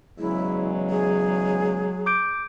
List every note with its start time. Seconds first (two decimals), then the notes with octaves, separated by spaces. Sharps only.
0.19 E2 C#3 F#3 G#3 E4
0.90 G#4
2.06 D6 G6 D7